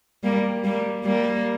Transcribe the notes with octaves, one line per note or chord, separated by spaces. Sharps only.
G3 A#3
G3 A#3
G3 A#3